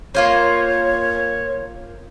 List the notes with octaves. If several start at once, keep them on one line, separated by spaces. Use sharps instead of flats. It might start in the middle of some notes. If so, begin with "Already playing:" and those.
A#3 F4 C5 C#5